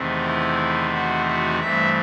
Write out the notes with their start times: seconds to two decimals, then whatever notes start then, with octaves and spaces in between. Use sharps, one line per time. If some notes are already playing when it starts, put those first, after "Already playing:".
Already playing: E2 C3 D#3 A3 C4
0.25 E4
0.93 F#4
1.27 F#4
1.60 G2 E3 A3 C4 E5